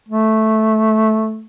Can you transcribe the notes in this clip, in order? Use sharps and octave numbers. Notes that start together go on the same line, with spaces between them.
A3